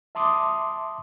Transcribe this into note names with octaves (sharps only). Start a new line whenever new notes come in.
E5 A5 C6 D6 D#6